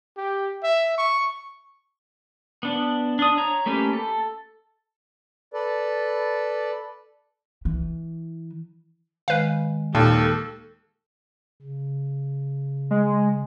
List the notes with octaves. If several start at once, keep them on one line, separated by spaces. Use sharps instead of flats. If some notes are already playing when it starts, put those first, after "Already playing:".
G4
E5
C#6
B3 D4
D4 D#6
C#5 A#5
A3 A#3 C#4 G4 B4
A4
A4 B4 D5
E3
D#3 G#3 B4 F5
D#2 A#2 A4
C#3
G#3